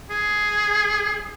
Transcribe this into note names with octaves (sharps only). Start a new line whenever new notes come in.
G#4